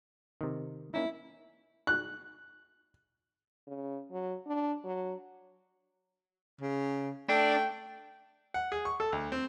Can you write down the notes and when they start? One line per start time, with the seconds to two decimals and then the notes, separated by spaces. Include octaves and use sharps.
0.41 C3 D#3
0.94 A#3 C#4 D#4 E4
1.87 F#6
3.67 C#3
4.11 F#3
4.46 D4
4.84 F#3
6.61 C#3
7.29 A3 D4 G5
8.54 F#5
8.72 G#4
8.85 C#6
9.00 A4
9.12 D2
9.32 C4